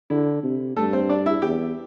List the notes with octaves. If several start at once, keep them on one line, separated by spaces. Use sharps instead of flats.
D3 E4
C3
G2 A3 A4
C4 C5
D4 D5
E4 E5
E2 G4 G5